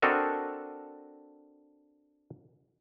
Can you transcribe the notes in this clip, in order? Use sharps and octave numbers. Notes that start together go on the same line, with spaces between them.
C4 D4 F#4 A4 A#4 D#5